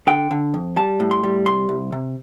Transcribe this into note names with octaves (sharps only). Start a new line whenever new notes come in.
D3 G5
D3
F2
G3 A5
A2
C6
G3
C2 C6
C2
C3